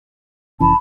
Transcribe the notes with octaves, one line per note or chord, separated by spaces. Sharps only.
F1 E3 C#4 A5 B5